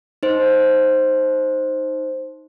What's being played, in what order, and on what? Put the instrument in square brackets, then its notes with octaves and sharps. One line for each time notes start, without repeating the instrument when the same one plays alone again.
[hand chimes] D#4 C5